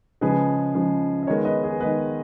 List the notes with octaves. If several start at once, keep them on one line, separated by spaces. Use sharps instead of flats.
C#3 F3 G#3 G#4 B4
C#3 F3 G#3
D#5
D#3 G#3 B3 A#4 C#5
B4 D#5
G#4 B4
D#3 G#3 B3 B4 D#5